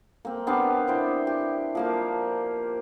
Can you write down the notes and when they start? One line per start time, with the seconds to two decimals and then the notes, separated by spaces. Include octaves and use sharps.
0.25 A#3 C4
0.47 B3 D4 G4 F5
0.88 E4 C5 G5
1.27 G4
1.75 F3 A#3 F5